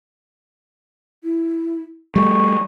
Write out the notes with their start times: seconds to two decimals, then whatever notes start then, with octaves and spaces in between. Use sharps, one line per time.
1.24 E4
2.16 G3 A3 C#6